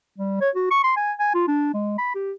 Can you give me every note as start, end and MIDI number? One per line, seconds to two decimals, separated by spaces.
0.19 0.41 55
0.41 0.50 73
0.55 0.66 66
0.71 0.80 85
0.84 0.92 84
0.96 1.12 80
1.19 1.34 80
1.34 1.46 65
1.48 1.71 62
1.74 1.95 56
1.98 2.14 83
2.15 2.32 67